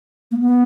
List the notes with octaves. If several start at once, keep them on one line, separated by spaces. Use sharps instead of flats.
A#3
B3